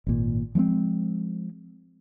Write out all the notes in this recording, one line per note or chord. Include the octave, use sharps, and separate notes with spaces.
G#1 A#2
F3 G#3 A#3 C4